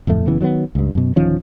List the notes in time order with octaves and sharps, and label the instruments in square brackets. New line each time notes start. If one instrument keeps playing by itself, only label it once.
[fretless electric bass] D1 F2 A2 A3
F#1 C#3 E3 B3
D#3 F#3 A#3 B3
C#2 G2
F#2 B2
D1 D#3 F3 C#4